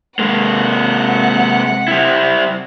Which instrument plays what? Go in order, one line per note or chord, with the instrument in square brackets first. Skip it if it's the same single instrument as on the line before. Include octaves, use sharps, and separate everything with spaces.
[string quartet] C3 F#5 [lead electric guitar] G#3 A#3
[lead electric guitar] G3 E4